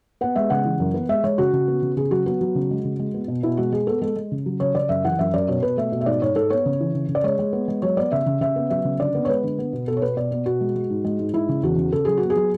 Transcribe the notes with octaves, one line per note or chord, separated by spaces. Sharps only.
B3 F#5
G#3 E5
C#3 F#5
E3
F#2
B3
G#3 E5
G#3 C#5
C#3 F#4
C#3
B3
C#3
C#3 G#4
F#3 F#4
B3 F#4
F#3
C#3
G#3
C#3
G#3
B3
B2
B2 E4
G#3 F#4
G#3 G#4
B3 A4
G#3 A4
G#3
C#3
F#3
C#3 C#5
C#3 D5
F#2 E5
E3 F#5
F#2 E5
F#2 D5
B2 C#5
B2 B4
A3 E5
B2
E5
G#2 D5
G#2 C#5
G#2 A4
B3 C#5
C#3
E3
C#3
C#3
D5
G#3 C#5
G#3
B3
G#3
F#3 C#5
B3 D5
C#3 E5
C#3
C#3 E5
B3
F#3 E5
C#3
D3 D5
B3
C#5
G#3 B4
D3
B3
B2
B2 A4
C#5
B3 B4
B2 D5
B3
B2 F#4
G#3
G#3
G#2
G#3
G#2
G#3 E4
C#3
E2 F#4
C#3
C#3 A4
F#3 G#4
B3 F#4
G#4
F#3